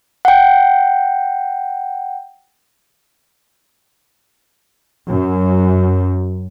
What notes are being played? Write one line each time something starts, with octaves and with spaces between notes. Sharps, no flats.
F#5 G5
F#2